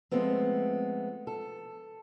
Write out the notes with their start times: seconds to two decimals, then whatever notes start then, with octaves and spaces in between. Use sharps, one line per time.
0.11 F3 G#3 A3 B3 C4
1.27 A4